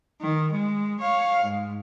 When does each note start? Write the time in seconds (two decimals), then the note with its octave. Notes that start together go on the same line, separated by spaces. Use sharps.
0.21 D#3
0.52 G#3
1.00 C#5 F5
1.42 G#2